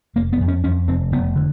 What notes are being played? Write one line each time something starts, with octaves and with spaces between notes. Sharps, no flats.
F1 A#3
B3
F2
C#4
F2 C#4
F1 C4
F1 B3
D3